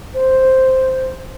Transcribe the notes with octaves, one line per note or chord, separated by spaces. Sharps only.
C5